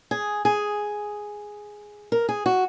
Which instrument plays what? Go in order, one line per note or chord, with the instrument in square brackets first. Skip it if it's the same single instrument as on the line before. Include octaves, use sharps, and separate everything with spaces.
[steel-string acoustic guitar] G#4
G#4
A#4
G#4
F#4